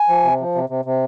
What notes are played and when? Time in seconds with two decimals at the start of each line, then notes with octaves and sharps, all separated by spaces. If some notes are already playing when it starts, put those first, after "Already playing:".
Already playing: G#5
0.09 F3
0.24 C3
0.40 F3
0.55 C3
0.70 C3
0.85 C3